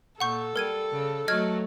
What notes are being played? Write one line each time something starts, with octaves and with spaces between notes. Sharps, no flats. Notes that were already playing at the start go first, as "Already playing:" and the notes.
A#2 A4 F#5 C#6 G6
G3 A#4 G#6 D#7
C#3
F#3 A3 D#5 F6 G#6